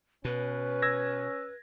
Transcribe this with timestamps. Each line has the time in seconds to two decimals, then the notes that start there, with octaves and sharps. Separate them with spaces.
0.25 B2 C#4 B4
0.82 E6 G#6 A#6